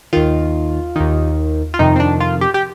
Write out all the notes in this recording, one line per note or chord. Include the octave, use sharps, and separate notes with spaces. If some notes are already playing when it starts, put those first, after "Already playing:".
D#2 D#3 F4
D#2 D#3
F4
F2 C3 D#3 D#4
C4
D4
F4
G4
G4